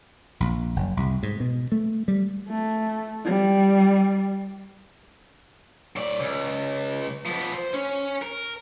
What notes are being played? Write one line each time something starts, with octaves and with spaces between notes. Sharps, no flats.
A#1
F#1
C2
G#2
B2
A3
G3
A3
G3
A2 D5
C#2
F3 B3
C5
C#4
A#4